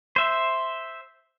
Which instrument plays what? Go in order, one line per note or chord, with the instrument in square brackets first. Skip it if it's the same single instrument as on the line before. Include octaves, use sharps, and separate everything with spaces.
[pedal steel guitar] C5 E5